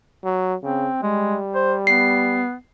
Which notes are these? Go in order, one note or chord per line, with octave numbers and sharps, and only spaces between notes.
F#3
C#3 C4
G3 G#3
C5
B3 C7